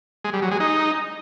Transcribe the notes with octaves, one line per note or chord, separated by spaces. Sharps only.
G#3
G3
F#3
G#3
D#4